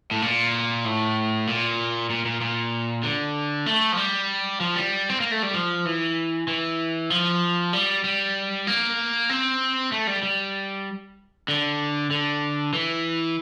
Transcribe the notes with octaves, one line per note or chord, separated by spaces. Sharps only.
A2
A#2
A2
A#2
A#2
A#2
A#2
D3
A3
F3
G3
F3
G3
C4
A#3
A3
G3
F3
E3
E3
F3
G3
G3
A#3
C4
A3
G3
G3
D3
D3
E3